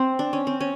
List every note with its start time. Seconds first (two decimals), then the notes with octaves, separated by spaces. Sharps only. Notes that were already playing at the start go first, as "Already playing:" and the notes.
Already playing: C4
0.19 D4
0.33 C#4
0.47 C4
0.61 C#4